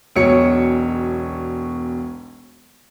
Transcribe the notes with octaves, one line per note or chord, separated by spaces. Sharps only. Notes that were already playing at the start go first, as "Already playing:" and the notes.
E1 B1 C#5 C#7